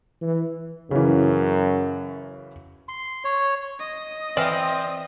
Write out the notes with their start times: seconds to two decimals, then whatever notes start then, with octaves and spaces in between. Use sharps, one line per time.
0.21 E3
0.91 F#2 C#3 E3
2.89 C6
3.24 C#5
3.79 D#5
4.37 E3 C4 D5 E5 F5 G5